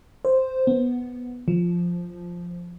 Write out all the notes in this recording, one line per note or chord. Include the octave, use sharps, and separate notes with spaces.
C5
B3
F3